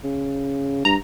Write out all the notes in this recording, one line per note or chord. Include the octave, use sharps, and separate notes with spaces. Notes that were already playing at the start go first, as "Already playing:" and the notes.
C#3
G2 A#5